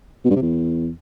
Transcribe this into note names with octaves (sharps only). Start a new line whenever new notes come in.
B2
G2
C3
E2